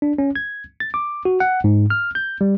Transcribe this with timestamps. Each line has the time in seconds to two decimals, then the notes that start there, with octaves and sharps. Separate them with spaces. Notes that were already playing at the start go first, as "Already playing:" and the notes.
0.02 D4
0.18 C#4
0.36 G#6
0.80 A6
0.94 D6
1.25 F#4
1.40 F#5
1.64 G#2
1.90 F6
2.15 G6
2.41 G3